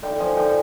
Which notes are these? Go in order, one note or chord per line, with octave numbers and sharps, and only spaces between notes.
D3 G5
F3 G#5
D3 G5